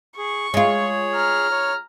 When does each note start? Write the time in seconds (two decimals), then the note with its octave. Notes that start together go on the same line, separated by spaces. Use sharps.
0.17 G#4 C#6
0.54 G#3 F4 G#4 C#5
1.14 A#5 F6
1.51 C#5